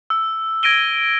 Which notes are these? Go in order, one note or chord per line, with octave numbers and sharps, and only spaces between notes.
E6
G#6 A#6 D7 D#7 G7